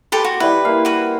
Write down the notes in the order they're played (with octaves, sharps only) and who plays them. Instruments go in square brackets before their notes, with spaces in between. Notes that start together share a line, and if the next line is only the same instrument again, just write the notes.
[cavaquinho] G4 A4 B4 [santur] C5
[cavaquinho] F#4
[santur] G3 E4 [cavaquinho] B4
[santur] A#3 F5
[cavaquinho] F#4 B4